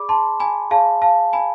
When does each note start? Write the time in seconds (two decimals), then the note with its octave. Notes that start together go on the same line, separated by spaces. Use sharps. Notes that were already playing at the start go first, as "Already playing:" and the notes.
Already playing: G#4 D5 B5 D6
0.09 A5 C6
0.40 G#5 B5
0.71 G#4 D5 F5 A5
1.02 F5 A5
1.33 G#5 B5